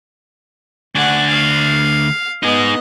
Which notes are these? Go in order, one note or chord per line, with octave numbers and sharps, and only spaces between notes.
D2 D4 F#5 G#5
F5
B3 D#4 G#4 D#5